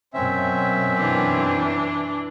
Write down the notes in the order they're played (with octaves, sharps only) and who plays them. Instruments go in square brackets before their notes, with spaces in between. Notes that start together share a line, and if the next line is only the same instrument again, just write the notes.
[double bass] F#2 B2 [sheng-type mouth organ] C4 C#4 E5
[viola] E3 D4